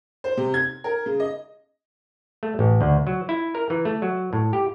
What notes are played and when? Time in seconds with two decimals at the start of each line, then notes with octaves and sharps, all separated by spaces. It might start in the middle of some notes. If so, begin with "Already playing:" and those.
0.24 C5
0.37 C3
0.54 G#6
0.84 A#4
1.06 C#3
1.20 D#5
2.43 A3
2.59 A1
2.81 D2
3.07 F#3
3.29 E4
3.55 A#4
3.70 E3
3.85 A3
4.02 F#3
4.33 A2
4.53 G4